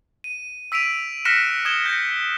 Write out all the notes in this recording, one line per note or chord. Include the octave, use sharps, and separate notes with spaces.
D#7
E6 B6 D7 D#7 F7
F6 F#6 A#6 B6 C#7 E7
D#6 G#6 E7 G7
G6 A#6 C#7